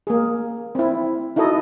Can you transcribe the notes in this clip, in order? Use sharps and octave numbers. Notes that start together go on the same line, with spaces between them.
A#3 G#4
C4 E4
D#4 E4 F#4 A4 D#5